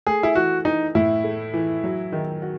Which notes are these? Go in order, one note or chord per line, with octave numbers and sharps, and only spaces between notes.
A3 G#4
E4
E3 F#4
E3 D#4
A2 E4
A3
E3
F#3
D#3
F#4